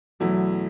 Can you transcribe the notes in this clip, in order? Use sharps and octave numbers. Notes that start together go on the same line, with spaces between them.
E2 B2 F#3 A3 E4